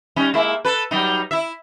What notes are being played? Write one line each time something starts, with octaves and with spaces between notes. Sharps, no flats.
G3 C#4 D#4
G#3 A#3 E4
A4 B4
F#3 G3 D#4
E4 E5